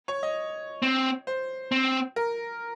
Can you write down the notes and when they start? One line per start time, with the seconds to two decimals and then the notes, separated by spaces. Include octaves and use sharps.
0.08 C#5
0.23 D#5
0.82 C4
1.27 C5
1.72 C4
2.16 A#4